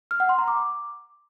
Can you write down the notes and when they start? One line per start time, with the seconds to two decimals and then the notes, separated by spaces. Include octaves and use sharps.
0.11 F6
0.20 F#5
0.29 C6
0.38 A#5
0.48 D6